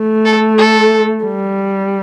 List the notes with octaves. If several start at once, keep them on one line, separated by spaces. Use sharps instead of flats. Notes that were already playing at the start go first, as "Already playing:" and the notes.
Already playing: A3
A4
A4
G3